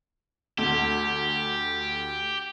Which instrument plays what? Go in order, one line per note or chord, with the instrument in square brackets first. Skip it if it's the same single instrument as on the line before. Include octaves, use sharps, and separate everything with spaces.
[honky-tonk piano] D2 [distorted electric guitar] G4